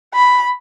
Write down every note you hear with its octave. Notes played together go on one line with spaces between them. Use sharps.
B5